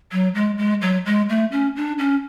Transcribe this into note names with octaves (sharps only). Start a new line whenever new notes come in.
F#3
G#3
G#3
F#3
G#3
A3
C#4
D4
C#4